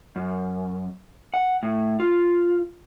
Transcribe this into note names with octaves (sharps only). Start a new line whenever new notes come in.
F#2
F#5
A2
F4